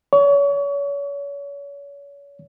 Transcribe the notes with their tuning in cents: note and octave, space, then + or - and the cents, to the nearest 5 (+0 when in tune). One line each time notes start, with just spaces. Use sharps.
C#5 +35